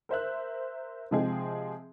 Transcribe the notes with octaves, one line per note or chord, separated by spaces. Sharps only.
A#4 C5 E5 F#6
C3 F3 G#3 C4 G#4